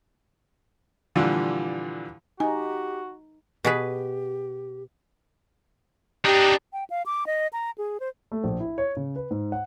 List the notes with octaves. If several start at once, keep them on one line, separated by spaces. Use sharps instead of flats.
A#2 D3 E3 F3 G3
D#4 F#4 G4 G#5
B2 G4 G#4 B4
D4 D#4 G4
G5
F5
D6
D#5
A#5
G#4
C5
A3
A#1
E4
C#5
C#3
B4
G#2
F#5